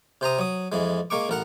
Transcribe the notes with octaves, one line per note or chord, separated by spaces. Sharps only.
C3 C5 A#5 D#6
F#3 D#6
F2 E3 G#3
G#3 A#3 C#6 D6
A1 A#4 F#5